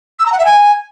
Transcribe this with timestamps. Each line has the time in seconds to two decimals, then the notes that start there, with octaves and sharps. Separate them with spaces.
0.19 E6
0.25 A#5
0.32 F#5
0.38 E5
0.45 G#5